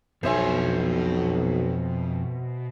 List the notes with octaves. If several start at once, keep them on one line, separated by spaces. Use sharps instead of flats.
B1 F2 B2 C5 C#5 E5 G#5